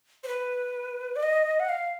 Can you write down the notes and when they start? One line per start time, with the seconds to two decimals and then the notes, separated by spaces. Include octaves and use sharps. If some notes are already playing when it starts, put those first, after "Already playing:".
0.24 C5
0.28 B4
1.16 D5
1.23 D#5
1.60 F#5
1.69 F5